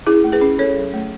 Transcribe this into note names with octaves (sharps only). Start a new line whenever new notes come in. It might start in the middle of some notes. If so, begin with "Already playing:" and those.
C#4 E4 G#4
A3
G#4 B4
C#4
C#4 A4 C#5
F#3
A3